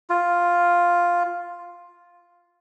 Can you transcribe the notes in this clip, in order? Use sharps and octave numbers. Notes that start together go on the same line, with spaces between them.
F4